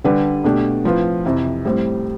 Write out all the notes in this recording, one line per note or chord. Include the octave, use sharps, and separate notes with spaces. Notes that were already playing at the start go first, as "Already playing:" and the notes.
D3 G3 D4 G4 B4
B2 A3 D4 G4
A2 F3 C4 F4 B4
F2 C3 E3
A2 G3 C4